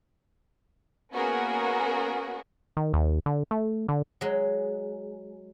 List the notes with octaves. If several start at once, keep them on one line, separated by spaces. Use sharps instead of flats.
A#3 B3 C#4 F#4 G#4 A#4
D#3
D#2
D3
A3
D3
F#3 G#3